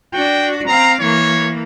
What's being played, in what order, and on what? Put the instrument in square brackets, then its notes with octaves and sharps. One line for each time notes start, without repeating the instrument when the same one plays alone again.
[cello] D4 F#4 [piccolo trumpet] G5
[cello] C4 F5 [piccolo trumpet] A#5
[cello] E3 A#3 [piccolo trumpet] C#5